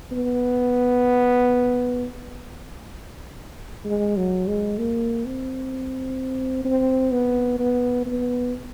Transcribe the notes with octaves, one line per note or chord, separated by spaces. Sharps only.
B3
G#3
F#3
G#3
A#3
C4
C4
B3
B3
B3